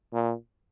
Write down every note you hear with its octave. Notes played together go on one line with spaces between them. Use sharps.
A#2